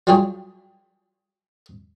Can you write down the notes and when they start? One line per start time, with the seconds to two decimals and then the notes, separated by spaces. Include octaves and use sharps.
0.07 F#3 G3 F4 G4 G#4 C#5